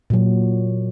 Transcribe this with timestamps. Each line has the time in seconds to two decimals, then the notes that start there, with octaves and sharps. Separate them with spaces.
0.10 A#2 F#3